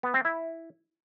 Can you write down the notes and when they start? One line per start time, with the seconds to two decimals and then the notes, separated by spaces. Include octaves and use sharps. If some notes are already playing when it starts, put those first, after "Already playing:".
0.03 B3
0.14 C4
0.25 E4